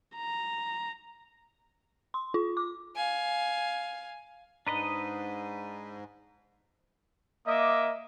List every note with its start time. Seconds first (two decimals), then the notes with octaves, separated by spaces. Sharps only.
0.16 A#5
2.14 C6
2.34 F4
2.57 D6
2.96 F5 G#5
4.67 G#2 D4 B4 D#5 A#5 D#6
7.46 A#3 D#5 E5 D6 D#6